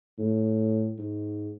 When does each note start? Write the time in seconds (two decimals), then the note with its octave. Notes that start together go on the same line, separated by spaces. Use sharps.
0.19 A2
0.98 G#2